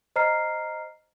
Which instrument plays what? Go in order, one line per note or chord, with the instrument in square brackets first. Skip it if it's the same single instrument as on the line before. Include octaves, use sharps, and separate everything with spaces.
[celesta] C5 D#5 A#5 F6 C7